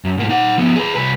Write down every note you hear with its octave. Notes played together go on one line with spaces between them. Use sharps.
F#2
G#2 A#3
D#4 F#5
F3 B3
G#4 B4
C2 B4